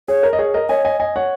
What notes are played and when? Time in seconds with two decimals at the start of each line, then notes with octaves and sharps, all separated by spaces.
0.08 G#4 C#5
0.23 A#4
0.33 D#5
0.39 G#4 C#5
0.54 A#4 D#5
0.69 C#5 D#5 G#5
0.85 D#5 G#5
1.00 D#5 G#5
1.16 C#5 F#5